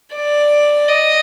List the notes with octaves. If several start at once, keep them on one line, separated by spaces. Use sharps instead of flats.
D5
D#5